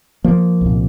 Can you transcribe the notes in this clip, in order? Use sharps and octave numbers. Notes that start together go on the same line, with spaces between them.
F3 A#3
C2 A#2